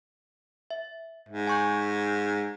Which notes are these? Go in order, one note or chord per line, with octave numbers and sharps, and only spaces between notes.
E5
G#2
G#5 C#6 G6